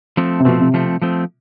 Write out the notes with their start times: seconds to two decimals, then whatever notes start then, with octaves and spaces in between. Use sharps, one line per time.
0.17 F3 A3 C4
0.40 C3
0.45 B2 F3 A3 C4
0.60 C3
0.74 F3 A3 C4
1.02 F3 A3 C4